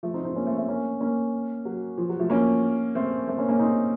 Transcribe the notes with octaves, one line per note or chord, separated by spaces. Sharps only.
F3 A3
C4 D#4
C4 D#4
A#3 C#4
A3 C4
A3 C4
A#3 C#4
A#3 C#4
F#3
F3
F#3
F3 A3
A#3 C#4
A3 C4
A3 C4
A#3 C#4
A#3 C#4
C4 D#4